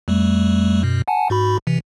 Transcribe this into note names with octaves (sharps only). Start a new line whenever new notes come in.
F2 G3 A3
F#2 B2
F#5 G#5 A5
G#2 F#4 B5
C3 E3